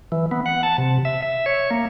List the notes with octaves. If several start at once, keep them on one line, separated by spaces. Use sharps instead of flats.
E3
B3
F#5
A5
C3
E5
E5
C#5
A#3